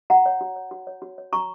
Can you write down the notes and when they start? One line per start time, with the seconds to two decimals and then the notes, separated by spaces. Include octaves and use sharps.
0.10 F#4 F#5 A#5
0.26 C#5
0.41 F#4
0.56 C#5
0.71 F#4
0.87 C#5
1.02 F#4
1.18 C#5
1.32 F#4 A#5 C#6